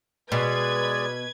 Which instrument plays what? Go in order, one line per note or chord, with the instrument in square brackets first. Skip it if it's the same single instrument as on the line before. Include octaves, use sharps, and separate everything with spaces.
[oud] B2 [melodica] G#3 D5 [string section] B4 G#6